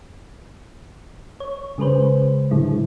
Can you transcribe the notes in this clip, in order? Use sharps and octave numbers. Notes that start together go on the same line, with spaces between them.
C#5
C#3 G#3 G#4 B4 C5
A2 D3 F#3 G#3 E4